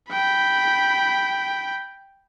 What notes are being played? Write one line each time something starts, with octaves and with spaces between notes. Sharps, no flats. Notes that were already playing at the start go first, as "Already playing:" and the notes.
G5 B5